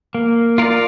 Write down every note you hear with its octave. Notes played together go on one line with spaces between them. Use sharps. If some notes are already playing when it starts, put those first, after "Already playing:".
A#3
F4 A#4 D5